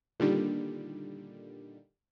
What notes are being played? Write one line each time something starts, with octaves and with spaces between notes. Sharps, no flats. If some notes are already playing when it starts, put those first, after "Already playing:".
A#2 D3 D#3 G3